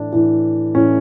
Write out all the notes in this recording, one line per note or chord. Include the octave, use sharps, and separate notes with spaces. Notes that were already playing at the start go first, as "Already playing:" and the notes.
Already playing: A2 E3 D4
A2 E3
A2 E3 C#4